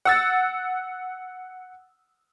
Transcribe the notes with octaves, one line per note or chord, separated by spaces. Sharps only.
F#5 E6 A6